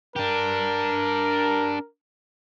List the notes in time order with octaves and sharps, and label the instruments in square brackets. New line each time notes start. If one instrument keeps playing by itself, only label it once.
[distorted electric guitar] D4 G4 [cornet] A#4